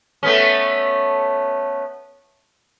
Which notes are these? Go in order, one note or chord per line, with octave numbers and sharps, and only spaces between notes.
A3 B3 C#4